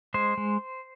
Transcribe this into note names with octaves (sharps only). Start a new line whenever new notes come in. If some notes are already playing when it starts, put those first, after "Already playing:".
G#3 C5
G#3